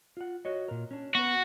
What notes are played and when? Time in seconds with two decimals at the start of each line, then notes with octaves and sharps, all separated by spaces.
0.17 F4 F#5
0.45 F#4 C#5 D#5
0.68 A#2 A#4
0.91 C#4 D4
1.15 B3 F#4 B4